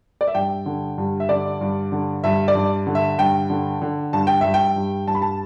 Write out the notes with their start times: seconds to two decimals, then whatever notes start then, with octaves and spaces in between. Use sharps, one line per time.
0.21 D5
0.27 E5
0.35 G2 G5
0.66 D3
0.98 G2
1.20 E5
1.29 D3 D5
1.61 G2
1.92 D3
2.24 G2 E5
2.48 D5
2.55 G2
2.87 D3
2.95 E5
3.18 G2 G5
3.50 D3
3.82 D3
4.13 G2 A5
4.27 G5
4.41 G2 E5
4.54 G5
4.76 G2
5.07 G2 A5
5.15 B5
5.22 A5